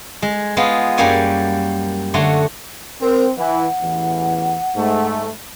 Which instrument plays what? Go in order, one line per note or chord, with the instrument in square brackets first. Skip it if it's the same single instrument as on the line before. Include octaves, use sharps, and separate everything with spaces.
[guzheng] G#3
G#3 B3 F4
F#2 G3 A#3 C#5 D5 G#5
D3 A3 F#4 C#5 C6
[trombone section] C4 [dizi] A#4
[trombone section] E3 [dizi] F#5
[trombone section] A1 E2 E3
G#2 A3